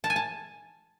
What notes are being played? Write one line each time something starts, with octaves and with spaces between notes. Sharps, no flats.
A5
G#5
A5